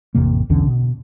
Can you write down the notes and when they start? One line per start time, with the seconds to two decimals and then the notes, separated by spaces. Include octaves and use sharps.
0.15 A1 F2 C3 A#3
0.49 B1 E2 D3 C#4
0.67 B2